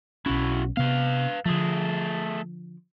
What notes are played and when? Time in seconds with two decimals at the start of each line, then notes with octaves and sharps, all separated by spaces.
0.26 B1 C#4 E4 F#4
0.77 C3 B3 B4 F5
1.46 D3 F3 A3 G#4